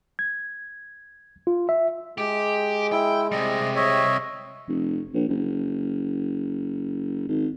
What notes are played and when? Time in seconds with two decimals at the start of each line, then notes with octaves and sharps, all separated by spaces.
0.19 G#6
1.47 F4
1.69 E5
2.18 G#3 G4
2.92 E4 G5
3.32 C3 G3 D#5
3.76 C#5 D#5 E5
4.68 F1
5.14 A#1
5.29 F#1
7.29 G#1